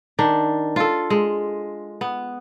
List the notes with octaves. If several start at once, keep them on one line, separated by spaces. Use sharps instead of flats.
D#3 D4
F4 A4
G#3
B3